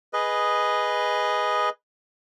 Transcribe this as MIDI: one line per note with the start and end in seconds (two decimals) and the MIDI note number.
0.13 1.69 68
0.13 1.69 71
0.13 1.69 75